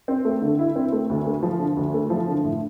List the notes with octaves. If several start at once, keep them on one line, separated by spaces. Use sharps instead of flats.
C4
A3
D3
E4
C4
A3
D2
A3
F3
D3
D2
A3
F3
D3
A2